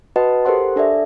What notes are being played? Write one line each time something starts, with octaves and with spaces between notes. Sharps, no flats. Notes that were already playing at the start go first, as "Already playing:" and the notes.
F#4 B4 D#5 F#5 A5
G4 A4 A#4 C5 F#5 C6
D4 A4 D5 E5